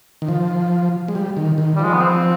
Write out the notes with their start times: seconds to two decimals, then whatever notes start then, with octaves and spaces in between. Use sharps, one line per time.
0.22 D#3
0.28 F3
1.08 G#3
1.15 G3
1.37 D#3
1.58 D#3
1.75 G3
1.79 F3
1.84 G#3
1.93 B3
2.00 C4